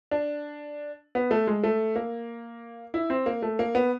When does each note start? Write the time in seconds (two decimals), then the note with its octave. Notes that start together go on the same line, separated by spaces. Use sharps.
0.11 D4
1.15 B3
1.31 A3
1.47 G#3
1.63 A3
1.96 A#3
2.94 E4
3.10 C4
3.26 A#3
3.42 A3
3.59 A#3
3.75 B3